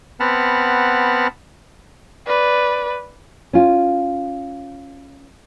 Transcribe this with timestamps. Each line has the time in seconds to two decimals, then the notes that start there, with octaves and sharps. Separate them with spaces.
0.20 B3 C4 F#5 A5 B5 F6
2.26 B4 D5
3.53 C#4 F4